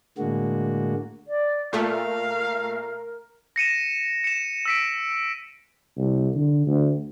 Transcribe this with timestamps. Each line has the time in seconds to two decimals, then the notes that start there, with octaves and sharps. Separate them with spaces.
0.18 A2 D3 G#3 A#3 F#4
1.27 D5
1.73 A#2 A3 A#4 F5
3.56 A#6 C#7 D#7 E7
4.24 C#7 E7
4.66 E6 B6 D7
5.97 C2
6.35 D3
6.66 D2